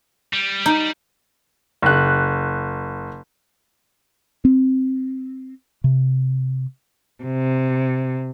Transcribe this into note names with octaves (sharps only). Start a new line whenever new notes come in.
G3
D#4
F#1 F#6
C4
C3
C3